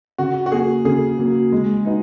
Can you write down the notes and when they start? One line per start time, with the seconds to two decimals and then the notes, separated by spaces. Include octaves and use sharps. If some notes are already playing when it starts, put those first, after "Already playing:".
0.18 C#3 F#4
0.46 F#4
0.52 F#3 A#3 G#4
0.85 C#3 G#4
1.18 F#3 A#3
1.52 G#3
1.85 D#4 F#4 B4 D#5